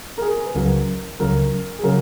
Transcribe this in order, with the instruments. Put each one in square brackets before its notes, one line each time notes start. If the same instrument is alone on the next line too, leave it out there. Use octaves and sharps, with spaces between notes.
[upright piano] A#4
G#4
B4
[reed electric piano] C#2 C#3 F#3 [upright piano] A#4
[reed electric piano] C#2 C#3 F#3 [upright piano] A#4
[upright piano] G#4
[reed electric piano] C#3 F#3 [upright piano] A#4